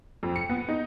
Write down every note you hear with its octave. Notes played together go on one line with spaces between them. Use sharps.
F2
C#7
B3
D#4